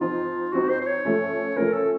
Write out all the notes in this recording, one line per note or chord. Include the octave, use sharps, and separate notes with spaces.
F3 C4 D#4 F4
F3 C4 D#4 F#4
C5
C5
C#5
F3 A3 C#4
F3 A3 C#4 A#4
A4